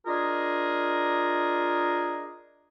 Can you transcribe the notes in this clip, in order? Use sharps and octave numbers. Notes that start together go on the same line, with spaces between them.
D4 F4 G#4 A#4 D#5